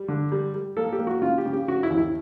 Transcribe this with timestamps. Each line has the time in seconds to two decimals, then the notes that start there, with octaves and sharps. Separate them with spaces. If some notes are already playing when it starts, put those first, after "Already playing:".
Already playing: G3
0.08 D3
0.32 G3
0.54 G3
0.77 A#3 A4
0.92 G4
0.99 A#3
1.07 F#4
1.22 C#3 F4
1.38 G4
1.46 C#3
1.53 G4
1.68 C#3 F#4
1.83 E4
1.90 D#2
1.98 E4